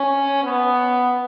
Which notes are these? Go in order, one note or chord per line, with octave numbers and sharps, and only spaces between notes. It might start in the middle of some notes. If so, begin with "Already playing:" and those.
Already playing: C#4
B3